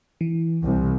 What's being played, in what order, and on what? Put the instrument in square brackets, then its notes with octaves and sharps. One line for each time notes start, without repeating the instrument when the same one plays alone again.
[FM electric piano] E3
[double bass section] C2